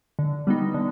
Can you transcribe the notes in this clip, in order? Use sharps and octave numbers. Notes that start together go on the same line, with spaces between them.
D3
G3 B3 D#4
D3